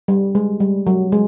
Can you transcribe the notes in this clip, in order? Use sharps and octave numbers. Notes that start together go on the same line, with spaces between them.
G3
G#3
G3
F#3
G#3